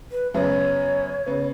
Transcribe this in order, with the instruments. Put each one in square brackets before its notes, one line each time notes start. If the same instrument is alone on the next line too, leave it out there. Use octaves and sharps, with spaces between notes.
[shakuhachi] B4
[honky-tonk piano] F#2 C#3 B3 [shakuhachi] C#5
[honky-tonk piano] C#3 B3